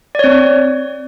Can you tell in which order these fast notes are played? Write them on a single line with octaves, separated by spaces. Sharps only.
D5 C#5 C4